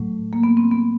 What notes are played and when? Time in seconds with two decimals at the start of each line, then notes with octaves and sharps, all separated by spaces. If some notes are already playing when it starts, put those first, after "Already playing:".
Already playing: A2 F#3 A3
0.33 A#3
0.43 B3
0.57 C4
0.71 B3